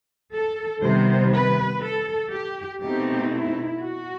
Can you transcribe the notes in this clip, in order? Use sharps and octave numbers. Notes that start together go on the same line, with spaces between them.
A4
C3 D#3 G3 B3 C5
B4
A4
G4
B2 A3 C4 D#4 G4
E4
F#4